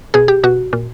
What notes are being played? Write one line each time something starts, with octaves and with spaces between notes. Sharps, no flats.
B2 G#4
G4
B2 F#4
A#2